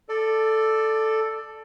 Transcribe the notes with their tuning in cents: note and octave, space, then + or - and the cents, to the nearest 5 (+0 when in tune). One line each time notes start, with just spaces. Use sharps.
A4 +0 D5 +15